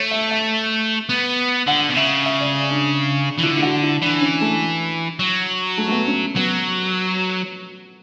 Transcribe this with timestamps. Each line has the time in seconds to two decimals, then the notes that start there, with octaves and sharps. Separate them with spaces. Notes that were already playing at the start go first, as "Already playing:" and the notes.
Already playing: A3 C#5
0.11 E5
0.31 E5
1.09 B3
1.67 D3 F#5
1.90 B2
1.97 C#3 E5
2.26 E5
2.41 D5
2.70 D4
3.38 E3
3.43 D3 E4
3.57 E4
3.62 F#4
3.83 E4
4.02 E3 D4
4.21 C#4
4.41 A3
5.19 F#3
5.78 A3
5.88 A3
5.92 B3
6.07 C#4
6.36 F#3 B3